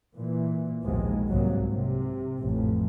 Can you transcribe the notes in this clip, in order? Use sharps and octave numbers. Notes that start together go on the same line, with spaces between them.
A#2 E3
A#1 D#2 G#2 B2 G#3
C2 G#2 F#3 A#3
C3
A1 F2